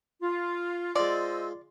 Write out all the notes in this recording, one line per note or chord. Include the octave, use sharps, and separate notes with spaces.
F4
G#3 F4 C5 D5 D#5 E6